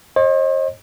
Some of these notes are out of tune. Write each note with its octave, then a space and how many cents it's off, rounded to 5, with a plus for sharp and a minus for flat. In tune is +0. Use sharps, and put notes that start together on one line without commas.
C5 +45 D#5 +0